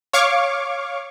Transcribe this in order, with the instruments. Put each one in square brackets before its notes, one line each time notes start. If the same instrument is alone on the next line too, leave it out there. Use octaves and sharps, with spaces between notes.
[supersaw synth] C#5 F5 C#6 D6